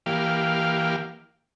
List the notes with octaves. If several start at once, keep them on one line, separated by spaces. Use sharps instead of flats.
E3 A#3 G4 F5